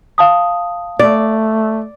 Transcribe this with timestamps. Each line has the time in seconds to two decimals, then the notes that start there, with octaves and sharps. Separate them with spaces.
0.18 F5 A5 D#6
0.99 A3 D5